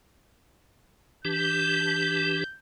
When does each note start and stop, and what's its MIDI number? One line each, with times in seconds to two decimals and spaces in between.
1.25 2.44 52
1.25 2.44 62
1.25 2.44 67
1.25 2.59 91